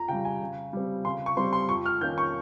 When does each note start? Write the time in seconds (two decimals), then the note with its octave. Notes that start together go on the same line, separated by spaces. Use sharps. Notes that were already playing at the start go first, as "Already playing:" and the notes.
Already playing: F2 A#5
0.08 C#3 G3 G5
0.25 G#5
0.41 C#3
0.73 G3 C4
1.05 C#3 C6
1.26 C#6
1.37 G3 C4 C6
1.53 C6
1.69 F2 C#6
1.86 F6
2.01 D#3 A#3 C#4 G6
2.18 C#6